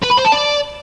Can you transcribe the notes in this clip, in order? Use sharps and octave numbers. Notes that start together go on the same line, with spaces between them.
B4
B5
C5
A5
D5